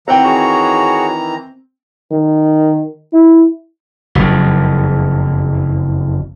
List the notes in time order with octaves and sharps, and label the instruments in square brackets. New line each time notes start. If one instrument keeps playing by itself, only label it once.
[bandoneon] D#3 E3 A#5 [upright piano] C4 G5 [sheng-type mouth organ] F#5
[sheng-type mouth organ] F#4 G#4 C#5
[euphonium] D#3
E4
[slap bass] F#1 F2